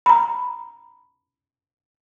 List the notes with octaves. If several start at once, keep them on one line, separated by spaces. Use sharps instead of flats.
A#5 B5